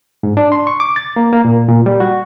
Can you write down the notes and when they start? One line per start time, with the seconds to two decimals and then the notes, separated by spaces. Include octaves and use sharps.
0.23 G#2
0.37 D4
0.52 C6
0.67 C#6
0.80 D6
0.96 A6
1.16 A#3
1.33 A#3
1.45 A#2
1.69 A#2
1.86 G3
2.00 F#4